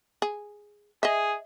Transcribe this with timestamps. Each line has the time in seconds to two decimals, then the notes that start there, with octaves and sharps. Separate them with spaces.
0.22 G#4
1.03 G#4 D#5 E5